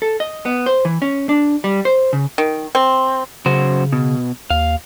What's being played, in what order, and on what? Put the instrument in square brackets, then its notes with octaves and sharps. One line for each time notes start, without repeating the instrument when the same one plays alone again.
[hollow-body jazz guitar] A4
D#5
B3
C5
E3
C#4
D4
G3
C5
C#3
[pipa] D#3
C4
[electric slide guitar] F#2 F#4 C5 [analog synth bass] C#3
[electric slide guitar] B2
[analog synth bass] D#2 [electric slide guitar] F5